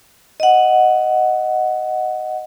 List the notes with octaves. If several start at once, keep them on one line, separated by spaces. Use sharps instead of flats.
D#5 F#5